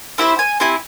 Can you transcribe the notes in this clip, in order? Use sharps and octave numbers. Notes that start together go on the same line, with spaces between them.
C4 E4 G4 C5
G#5
C4 E4 G4 G#5